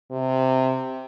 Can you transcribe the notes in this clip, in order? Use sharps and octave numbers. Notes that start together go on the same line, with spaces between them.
C3